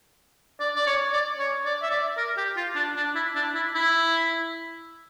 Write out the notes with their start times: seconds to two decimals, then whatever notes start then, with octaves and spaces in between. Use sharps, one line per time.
0.60 D5
0.76 D5
0.87 C#5
1.13 D5
1.40 C#5
1.66 D5
1.83 E5
1.91 D5
2.18 A#4
2.38 G4
2.57 F4
2.76 D4
2.97 D4
3.15 E4
3.36 D4
3.55 E4
3.75 E4